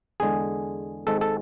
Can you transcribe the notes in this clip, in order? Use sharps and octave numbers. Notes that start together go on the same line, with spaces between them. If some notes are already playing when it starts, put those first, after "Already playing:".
E2 D3 G#3 G#4
G#1 G#2 G#3 A4
A4